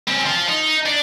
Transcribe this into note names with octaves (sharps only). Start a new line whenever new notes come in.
C4 C#4
F3 F4
D#4
D4